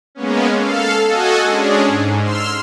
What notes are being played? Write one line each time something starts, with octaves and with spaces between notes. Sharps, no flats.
G#3 A#3 B3 C#4
A4 F5
F#4 A4 D#5 F#5 G#5
G#3 C#4 D4 G#4
G#2
C6 E6 F6